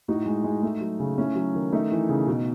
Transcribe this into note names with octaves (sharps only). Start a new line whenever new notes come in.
A2 D#4 F#4
G#3
G#3
A3
F#3
C#3
A3 C#4 E4
F#3
D#3
A3 D#4
E3
C#3
B2